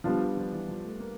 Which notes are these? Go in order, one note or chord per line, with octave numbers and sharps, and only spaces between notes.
F3 G3 B3 D4 F4
F3
E3
F3
A3
A#3